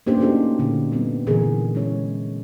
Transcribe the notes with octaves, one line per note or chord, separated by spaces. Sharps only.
A#3 C#4 D4 E4 G4 C5
A3 C#4 D#4 F#4 G4 A4
A#2 D3
G3 B3 C4
A#2 D3 E3 E4 G#4 A#4
G#3 C#4 E4 C#5